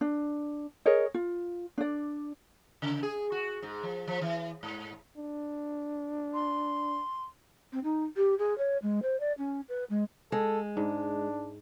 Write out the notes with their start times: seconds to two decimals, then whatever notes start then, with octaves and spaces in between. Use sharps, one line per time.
0.01 D4
0.86 G#4 A#4 C#5 D#5
1.14 F4
1.78 D4 D5
2.82 C#3
3.03 G#4
3.32 F#4
3.62 G#2
3.83 F3
4.08 F3
4.21 E3
4.63 G#2
5.17 D4
6.34 C6
7.72 C4
7.83 D#4
8.16 G4
8.38 G#4
8.58 C#5
8.82 G#3
9.02 C5
9.20 D5
9.37 C#4
9.68 B4
9.89 G#3
10.32 G#3 A4
10.77 G#2 D4